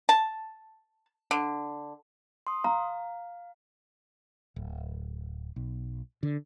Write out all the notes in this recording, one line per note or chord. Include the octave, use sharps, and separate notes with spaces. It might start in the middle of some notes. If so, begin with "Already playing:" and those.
A5
D3
C6 D#6
F5 A#5
D1
B1
D3